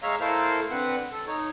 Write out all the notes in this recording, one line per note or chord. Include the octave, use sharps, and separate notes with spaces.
G#3 C#5 E5 F5 A#5
A3 E4 A4 A#4 C5 F5
D3 C4 B4 F#5
A4
D#4 C#5